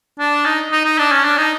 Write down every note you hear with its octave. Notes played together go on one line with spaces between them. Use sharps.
D4
D#4
D#4
D#4
D4
C#4
D4
D#4